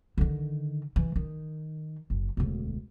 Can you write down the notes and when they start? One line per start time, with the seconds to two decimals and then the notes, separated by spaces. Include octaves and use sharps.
0.18 D3 D#3
0.96 E3
1.16 D#3
2.10 F#1
2.37 E1 D2